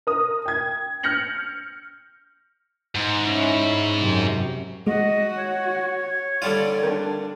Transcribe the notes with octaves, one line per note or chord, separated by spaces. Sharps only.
A#4 D#6
G5 G#6
F6 G6 A#6 C#7 F#7
G#2
C#4 E4
F#2 C3
G#3 F#4 D#5
C#5
D3 G3 F4 D5
D4 A#4 G5